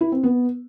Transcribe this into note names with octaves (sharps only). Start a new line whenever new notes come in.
E4
C4
B3